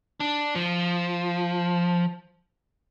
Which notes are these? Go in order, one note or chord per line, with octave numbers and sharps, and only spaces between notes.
D4
F3